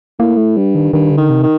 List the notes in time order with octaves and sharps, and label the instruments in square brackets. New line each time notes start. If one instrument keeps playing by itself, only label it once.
[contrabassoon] A2 [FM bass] A#3
[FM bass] A3
[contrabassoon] G2 [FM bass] G3
[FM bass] D#3
[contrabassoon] G2 [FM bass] D#3
[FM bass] D3
[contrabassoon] D#3
[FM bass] C3
[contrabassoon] D#3